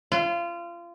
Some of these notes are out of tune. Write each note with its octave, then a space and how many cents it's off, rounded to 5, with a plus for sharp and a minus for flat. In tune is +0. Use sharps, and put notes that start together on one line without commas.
F4 -25